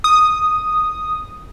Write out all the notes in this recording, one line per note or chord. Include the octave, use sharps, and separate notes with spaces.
D#6